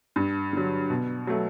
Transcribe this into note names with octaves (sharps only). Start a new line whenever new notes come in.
G2
D3 F#3
B2
F#3 A3